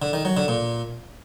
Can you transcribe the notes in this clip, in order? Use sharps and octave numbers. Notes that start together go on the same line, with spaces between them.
D3
D#3
F#3
D3
A#2